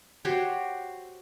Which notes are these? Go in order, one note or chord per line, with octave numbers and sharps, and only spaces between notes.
F#4 G4 C5 C#5